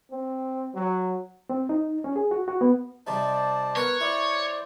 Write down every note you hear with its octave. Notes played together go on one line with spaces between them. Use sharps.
C4
F#3
C4
D#4
C#4
G#4
F#4
F#4
B3
C3 G3 D#4 C5 D5 A5
B3 A#4 C#5 F#5
E4 C5 D5